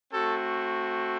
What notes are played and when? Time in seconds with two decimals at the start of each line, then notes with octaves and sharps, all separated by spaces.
0.13 A3 C4 F#4 A4